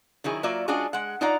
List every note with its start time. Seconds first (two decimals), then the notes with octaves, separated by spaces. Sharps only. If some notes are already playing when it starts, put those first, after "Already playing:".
0.24 D#3 F#3 E4 G#4
0.43 F#3 A#3 F4 D5 E5
0.68 G#3 C#4 D4 F4 F#4 G#4
0.93 G#3 F#5
1.21 D#4 F4 D5 F#5 A#5